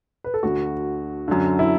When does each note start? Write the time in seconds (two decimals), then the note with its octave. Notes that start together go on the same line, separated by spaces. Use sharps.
0.24 B4
0.34 A4
0.43 D2 D3 F#4
1.28 F#2 D3
1.59 E4